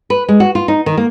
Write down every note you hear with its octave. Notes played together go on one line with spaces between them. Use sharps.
B4
G#3
F#4
F4
D#4
D#3
A#3